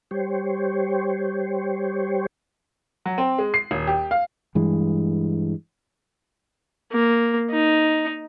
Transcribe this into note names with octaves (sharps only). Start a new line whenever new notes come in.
G3 G4 C5 C#5
F#3
C4
G#3
C7
D#1
G4
F5
G2 E3 G#3
A#3
D#4